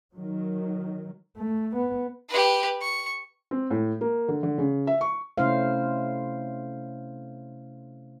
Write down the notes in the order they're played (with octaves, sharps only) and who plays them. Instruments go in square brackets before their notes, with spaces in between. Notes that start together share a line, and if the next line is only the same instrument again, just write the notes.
[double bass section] D#3 F#3
[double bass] A3
B3
[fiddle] G4 B4
C#6
[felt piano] C4
A2
A#3
D3
D3
C#3
E5
C#6
[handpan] C3 A3 C#4 E4 C5 F5